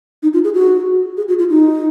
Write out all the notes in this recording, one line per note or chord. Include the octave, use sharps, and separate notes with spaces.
D#4
F4
G#4
F#4
G#4
F#4
F4
D#4